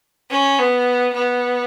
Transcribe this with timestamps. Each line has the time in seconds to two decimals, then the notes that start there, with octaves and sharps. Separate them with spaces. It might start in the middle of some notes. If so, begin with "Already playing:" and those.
0.31 C#4
0.59 B3
1.14 B3